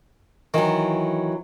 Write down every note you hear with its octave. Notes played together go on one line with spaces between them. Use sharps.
D#3 E3 F#3